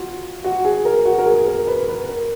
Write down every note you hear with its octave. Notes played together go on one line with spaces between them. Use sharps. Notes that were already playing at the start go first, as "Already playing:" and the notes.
Already playing: F4 F#4
F#4
G#4
A#4
F#4
A#4
G#4
A#4
B4
B4
A#4